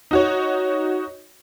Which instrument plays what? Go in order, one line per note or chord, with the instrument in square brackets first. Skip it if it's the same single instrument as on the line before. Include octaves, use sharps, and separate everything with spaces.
[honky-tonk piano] D#4 F#4 C#5